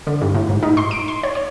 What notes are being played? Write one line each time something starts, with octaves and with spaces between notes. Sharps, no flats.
D3
G2
A2
G#2
D#4
C6
D7
C6
C#5
C#5